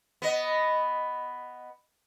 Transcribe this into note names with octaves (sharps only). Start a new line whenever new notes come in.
B3 D#5